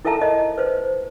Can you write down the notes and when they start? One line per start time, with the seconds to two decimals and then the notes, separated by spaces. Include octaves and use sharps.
0.05 E4 A4 A#4 E5 A5 A#5
0.22 D#5
0.58 B4 C5